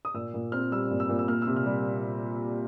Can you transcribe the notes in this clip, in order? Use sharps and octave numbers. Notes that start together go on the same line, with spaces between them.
D#6
A#2 E6
A#2
C4 F6
G3 E6
A#2
E6
A#2
E6
A#3 F6
C3 E6
F6
G3